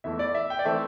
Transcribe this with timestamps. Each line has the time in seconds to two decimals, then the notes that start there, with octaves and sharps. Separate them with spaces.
0.04 E2 E3 A3 E5
0.19 D5
0.35 E5
0.50 G5
0.59 D5
0.65 E3 A3 C4 E5